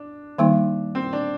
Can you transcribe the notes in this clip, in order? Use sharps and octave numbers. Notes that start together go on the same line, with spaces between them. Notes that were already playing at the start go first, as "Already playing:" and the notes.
Already playing: D4
D#3 G3 A#3 D#4
C4
D4